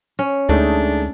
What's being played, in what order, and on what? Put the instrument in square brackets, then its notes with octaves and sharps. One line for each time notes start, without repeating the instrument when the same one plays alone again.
[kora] C#4
[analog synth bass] D2 [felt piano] G#3 A3 D#4 [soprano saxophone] D4